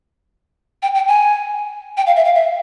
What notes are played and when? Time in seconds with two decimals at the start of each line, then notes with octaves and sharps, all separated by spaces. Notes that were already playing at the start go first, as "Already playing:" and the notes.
0.83 G5
0.95 G5
1.08 G#5
1.97 G5
2.07 F5
2.16 E5
2.25 F5
2.35 E5